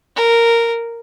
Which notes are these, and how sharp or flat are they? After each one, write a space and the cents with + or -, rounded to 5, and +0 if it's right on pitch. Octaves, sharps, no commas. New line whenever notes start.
A#4 -5